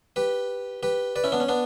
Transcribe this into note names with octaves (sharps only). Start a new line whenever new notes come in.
G4 B4
G4 B4
B4 D5
C#4 E4
B3 D4
C#4
B3 D4